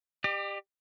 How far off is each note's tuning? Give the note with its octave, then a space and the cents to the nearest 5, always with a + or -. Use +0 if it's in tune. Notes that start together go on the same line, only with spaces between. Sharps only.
G4 +15 D5 +45